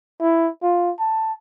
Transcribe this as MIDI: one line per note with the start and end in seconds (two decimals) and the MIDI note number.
0.21 0.49 64
0.63 0.91 65
0.99 1.33 81